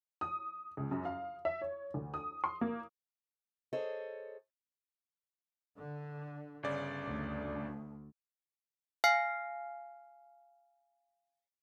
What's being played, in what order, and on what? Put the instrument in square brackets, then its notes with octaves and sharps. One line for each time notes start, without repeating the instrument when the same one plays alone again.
[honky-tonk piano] D#6
C#2
F#2
F5
E5
C#5
D2
D#6
C6
A#3
[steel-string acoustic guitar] G#4 A4 C5 C#5 D#5
[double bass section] D3
[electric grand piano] G1 C#3 D5
[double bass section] D2
[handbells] F5 G#5 F6 C7